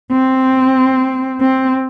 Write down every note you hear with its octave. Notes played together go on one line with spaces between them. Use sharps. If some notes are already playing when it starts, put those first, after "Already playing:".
C4
C4